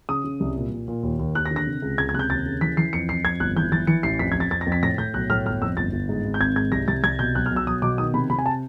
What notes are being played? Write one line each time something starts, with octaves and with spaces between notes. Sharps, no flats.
C#3 D#6
C#3
C2
A#2
A#2
A#2
D#2
D#2
D#2 F#6
A#6
D3
A#6
C3
C#2
C#2 G#6
G#6
C3 F#6
G6
D#2 A6
C#3
E3 B6
E3 C7
F2 C#7
F2 C7
F2 G#6
G1 F#6
E3 G6
E3 A6
E3 C#7
A1 C7
F2 B6
F2 G#6
A6
F2 A6
A#6
F2
B6
A2 A#6
A2 G6
B1 F#6
A2 F6
G1 F6
F2 E6
G1 A6
G1
G#2
G#1
G6
G#1 G#6
G#2 G#6
C2 A#6
C2 A6
C2 G#6
B2 G6
B1 F#6
F6
B1
E6
B1 D#6
B2 D6
D#3 D#6
C3 B5
C3 B5
G#5
A5